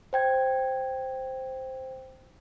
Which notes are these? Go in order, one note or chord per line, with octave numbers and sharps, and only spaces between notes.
C5 G5 G#6